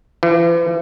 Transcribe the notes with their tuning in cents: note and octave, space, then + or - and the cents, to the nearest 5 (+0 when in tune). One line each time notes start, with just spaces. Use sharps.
E3 +45